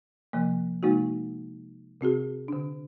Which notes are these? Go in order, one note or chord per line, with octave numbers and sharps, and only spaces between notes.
C3 F3 A#3
C3 G#3 A#3 D#4 F#4
C3 C4 F#4 G#4
D3 D4